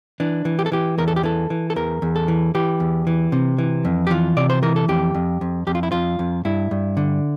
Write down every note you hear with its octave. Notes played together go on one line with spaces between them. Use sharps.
E3 D4
E3
G4
A4
E3 G4
E2 A#4
A4
G4
E3 A4
E3
A4
E2 A#4
E2
A4
E3
E3 G4
E2
E3
C3
E3
F2
G4
E3 F4
C3 D5
C5
E3 A#4
A4
F2 G4
F2
F2
F2 G4
F4
E4
F2 F4
F2
G2 E4
G2
D3